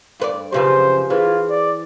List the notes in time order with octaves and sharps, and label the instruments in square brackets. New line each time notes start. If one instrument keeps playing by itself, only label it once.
[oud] G2 B4 D5
[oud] F#2 C#3 F3 [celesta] G4 B4 [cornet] C5
[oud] E3 [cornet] F4 [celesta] G#4 B4 C5
[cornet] D5